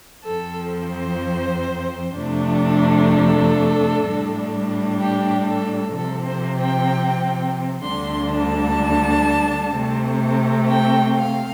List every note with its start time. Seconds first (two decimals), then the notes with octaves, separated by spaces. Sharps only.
0.24 F2 F3 C4 A4
0.72 C5
2.14 F2 C3 F3 A3 D4
3.10 A4
4.05 A2 G3 D4
5.00 G4
5.47 A4
5.95 C3 F3 C4 A4
6.26 C5
6.58 G5
7.84 D2 D3 G3 D4 C6
8.32 A5
9.75 C3 A3 C4
10.69 G5
11.16 F5